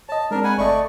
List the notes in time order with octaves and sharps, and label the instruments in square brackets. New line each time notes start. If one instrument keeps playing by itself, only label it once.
[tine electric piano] C#5 D#5 [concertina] A5
[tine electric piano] G#3 C4 [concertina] D4 A#4
[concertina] F#5 G#5 [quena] B5
[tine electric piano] G1 D#5 [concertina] A3 C#6 [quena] D5